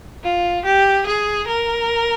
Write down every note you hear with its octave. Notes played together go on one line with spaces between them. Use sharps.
F4
G4
G#4
A#4